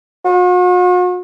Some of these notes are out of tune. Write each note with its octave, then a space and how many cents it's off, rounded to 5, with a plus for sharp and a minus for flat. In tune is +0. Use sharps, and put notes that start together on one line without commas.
F#4 -45